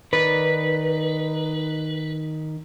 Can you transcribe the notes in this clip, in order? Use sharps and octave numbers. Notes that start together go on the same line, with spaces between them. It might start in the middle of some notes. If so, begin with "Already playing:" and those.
D#3 D#4 B4 D5